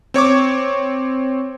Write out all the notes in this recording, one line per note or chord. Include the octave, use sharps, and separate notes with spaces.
C4 C#5 C#6 D6